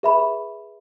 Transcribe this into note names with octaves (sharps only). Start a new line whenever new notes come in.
G#4 B4 E5 B5